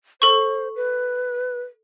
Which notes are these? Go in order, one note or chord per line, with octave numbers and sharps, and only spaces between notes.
A4 C5 C#6
B4